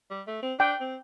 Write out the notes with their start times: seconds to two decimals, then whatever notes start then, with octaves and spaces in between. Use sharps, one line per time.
0.11 G3
0.27 A3
0.43 C4
0.59 D4 G5
0.81 C4